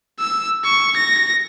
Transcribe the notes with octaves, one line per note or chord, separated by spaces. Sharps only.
E6
C#6
A#6